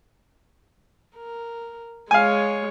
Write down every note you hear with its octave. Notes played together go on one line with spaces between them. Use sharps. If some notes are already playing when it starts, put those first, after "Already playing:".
A#4
G#3 C#5 F5 G#5